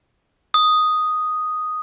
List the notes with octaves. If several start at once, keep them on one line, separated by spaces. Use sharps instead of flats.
D#6